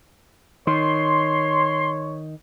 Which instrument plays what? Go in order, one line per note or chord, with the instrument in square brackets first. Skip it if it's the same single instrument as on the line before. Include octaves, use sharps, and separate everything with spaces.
[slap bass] D#3 [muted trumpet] C#5 [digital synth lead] C6